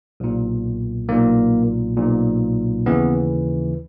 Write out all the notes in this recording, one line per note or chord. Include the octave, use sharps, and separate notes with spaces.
B1 A#2
B1 A#2 A#3
B1 A#2
D#2 C#3 E3 B3